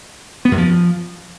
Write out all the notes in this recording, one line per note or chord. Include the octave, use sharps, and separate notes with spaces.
B3
F#2
F3